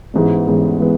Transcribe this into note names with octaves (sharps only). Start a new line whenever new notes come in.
A1 G#2 E3 G#3 B3
A1 G#2 E3 G#3 B3
E3 G#3 B3